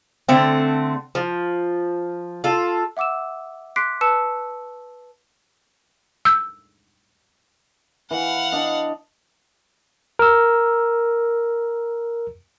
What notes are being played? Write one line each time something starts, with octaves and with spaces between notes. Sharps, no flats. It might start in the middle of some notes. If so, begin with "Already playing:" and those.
D3 A3 C4
F3
F4 A4
E5 F#5 D6 E6 E7
C6 D6 F#6 B6 C7 D7
B4 A5 E6 C#7 E7
E6 G6
E3 F5 F#5
D4 D#5
A#4 E6